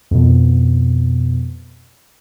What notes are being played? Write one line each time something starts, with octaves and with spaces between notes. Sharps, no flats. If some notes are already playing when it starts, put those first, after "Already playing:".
F2 B2